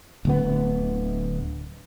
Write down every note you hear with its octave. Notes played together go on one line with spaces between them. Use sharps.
D1 D2 B3